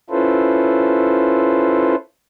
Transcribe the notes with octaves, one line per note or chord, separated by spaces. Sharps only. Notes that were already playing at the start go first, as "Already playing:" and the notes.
C#4 E4 F4 A4 B4 C5